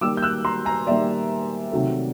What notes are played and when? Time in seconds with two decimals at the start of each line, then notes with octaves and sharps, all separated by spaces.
0.01 D#3 G3 A#3 D6 E6
0.17 G6
0.22 E6 F#6
0.45 A#5 C6
0.65 G#5 A#5
0.87 D#3 G3 A#3 D5 E5
1.72 C3 D#3 F#3 A3